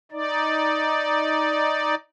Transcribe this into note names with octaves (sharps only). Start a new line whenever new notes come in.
D#4 D5